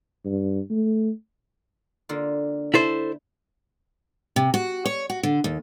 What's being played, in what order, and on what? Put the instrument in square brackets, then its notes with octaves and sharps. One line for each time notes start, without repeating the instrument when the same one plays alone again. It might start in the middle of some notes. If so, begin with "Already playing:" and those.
[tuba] G2
A3
[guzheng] D3 A#3 F4
[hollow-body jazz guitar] E4 A4 C5
[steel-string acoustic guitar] C3
F#4
C#5
F#4
D3
D#2